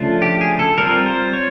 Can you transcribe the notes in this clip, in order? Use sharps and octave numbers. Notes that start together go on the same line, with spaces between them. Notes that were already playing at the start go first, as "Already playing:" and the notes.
Already playing: C#3 F3 A3 D4 F4
G4
G#4
A4
G3 C4 F4 A#4
C5
C#5